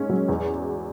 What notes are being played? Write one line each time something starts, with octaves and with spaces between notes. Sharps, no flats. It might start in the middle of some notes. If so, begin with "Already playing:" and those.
Already playing: G#2 C#4
F#3
E2